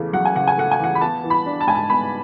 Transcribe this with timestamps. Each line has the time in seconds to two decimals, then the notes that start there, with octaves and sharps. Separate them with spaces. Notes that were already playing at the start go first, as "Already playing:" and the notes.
Already playing: E2 C#3 A3
0.13 F#3 F#5
0.25 G#5
0.35 C#3 F#5
0.47 G#5
0.57 A3 F#5
0.71 G#5
0.79 E2 F#5
0.95 B5
1.01 B3 A5
1.23 E3
1.30 B5
1.46 D4
1.61 A5
1.67 G#2 G#5
1.75 A5
1.90 B3 B5